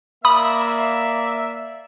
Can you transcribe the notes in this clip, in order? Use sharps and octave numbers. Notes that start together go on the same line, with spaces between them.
A#3 D5 E5 B5 D#6